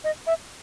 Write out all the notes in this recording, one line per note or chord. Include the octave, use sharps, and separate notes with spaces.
D#5
E5